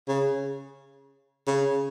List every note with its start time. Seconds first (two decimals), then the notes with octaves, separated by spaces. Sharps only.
0.08 C#3
1.47 C#3